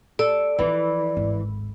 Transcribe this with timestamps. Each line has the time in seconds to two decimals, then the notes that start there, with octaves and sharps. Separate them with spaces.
0.19 A4 D5
0.59 E3 F3 E4
1.16 D1 G#1